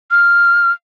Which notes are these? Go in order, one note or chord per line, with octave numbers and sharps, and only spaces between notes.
F6